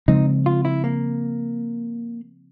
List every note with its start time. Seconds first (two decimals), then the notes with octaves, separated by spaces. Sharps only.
0.08 C#3 F3 G#3 C4 D#4
0.46 F4
0.65 E4
0.84 A#3